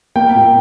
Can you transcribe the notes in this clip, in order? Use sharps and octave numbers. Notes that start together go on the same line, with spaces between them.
A#3 G5
A#2